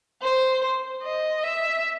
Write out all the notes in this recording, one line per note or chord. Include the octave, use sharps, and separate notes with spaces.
C5
D#5
E5